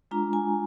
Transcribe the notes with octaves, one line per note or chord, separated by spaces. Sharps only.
G#3 D4 F4 A#5
G#5